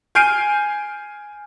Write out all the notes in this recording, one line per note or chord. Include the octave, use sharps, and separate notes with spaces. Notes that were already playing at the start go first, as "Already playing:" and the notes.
G#5 F6 G6 C7 D7 D#7